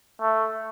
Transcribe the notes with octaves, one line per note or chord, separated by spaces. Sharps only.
A3